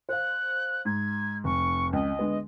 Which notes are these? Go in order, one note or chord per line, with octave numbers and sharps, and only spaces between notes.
C5 F5 F#6
G#2 G#6
F1 C#6
C#2 D#5
D3 G#3 B3